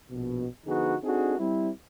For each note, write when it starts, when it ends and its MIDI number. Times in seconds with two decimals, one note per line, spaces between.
0.11 0.46 34
0.11 0.46 47
0.66 0.95 50
0.66 0.95 53
0.66 0.95 59
0.66 0.95 63
0.66 0.95 66
0.66 0.95 68
1.03 1.36 60
1.03 1.36 62
1.03 1.36 63
1.03 1.36 66
1.03 1.36 68
1.03 1.36 69
1.38 1.70 55
1.38 1.70 60
1.38 1.70 64